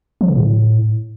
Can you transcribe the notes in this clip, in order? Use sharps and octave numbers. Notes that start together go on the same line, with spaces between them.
F3
C#3
A2